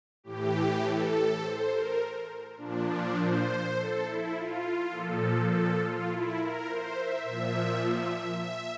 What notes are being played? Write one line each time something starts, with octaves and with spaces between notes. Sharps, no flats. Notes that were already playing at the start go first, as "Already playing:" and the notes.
A2 E3 G4
A4
C5
A#4
A#2 F3 D4
D4
C5
A4
E4
F4
A#2 F3 A4
A4
F4
E4
A#4
C5
E5
A#2 F3 E5
E5
E5